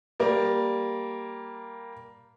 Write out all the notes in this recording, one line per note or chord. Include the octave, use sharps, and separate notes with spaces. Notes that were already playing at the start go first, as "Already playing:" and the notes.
G3 A#3